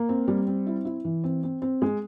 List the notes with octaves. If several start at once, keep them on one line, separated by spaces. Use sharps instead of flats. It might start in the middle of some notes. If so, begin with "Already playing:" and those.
Already playing: A#3
C4
G3
C4
E4
E4
E3
C4
C4
C4
G#3